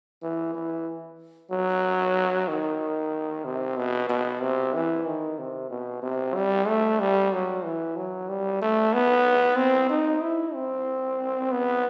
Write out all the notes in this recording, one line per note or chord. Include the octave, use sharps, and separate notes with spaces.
E3
E3
F#3
D#3
C3
B2
B2
C3
E3
D#3
C3
B2
C3
G3
A3
G3
F#3
E3
F#3
G3
A3
B3
C4
D#4
E4
C4
B3